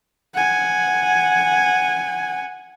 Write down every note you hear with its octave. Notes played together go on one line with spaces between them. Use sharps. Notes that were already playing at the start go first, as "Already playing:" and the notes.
F#5 G#5